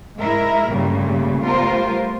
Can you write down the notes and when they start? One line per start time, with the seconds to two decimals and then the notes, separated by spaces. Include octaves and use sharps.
0.21 G#2 G#3 E4 A#4 E5
0.69 G2 A#2 C#3 G3 A3
1.44 G3 A3 B3 F4 A#4 C5